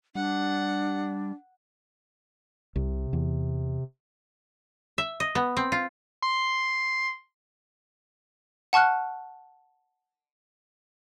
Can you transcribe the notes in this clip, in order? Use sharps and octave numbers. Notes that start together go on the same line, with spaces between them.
G3 D4 F#5
C2 C3
E2
E5
D#5
B3
C4
F4
C6
F#5 A5 C#6 F6 F#6